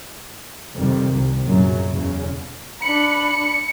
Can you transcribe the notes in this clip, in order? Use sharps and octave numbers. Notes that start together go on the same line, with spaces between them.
F2 C3 D#3 G3
C2
F#2 A#2 C#3 F#3
E2 C#3
D4 B5 C#7